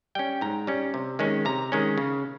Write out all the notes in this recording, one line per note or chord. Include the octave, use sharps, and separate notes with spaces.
G3 C#4 G5
G#2 A#5
G3 C#4
C3
D#3 G#3 C#4
C3 A#5
D#3 G#3 C#4
C#3